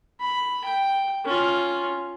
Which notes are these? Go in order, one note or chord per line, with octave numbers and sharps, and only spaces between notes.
B5
G5
C#4 F4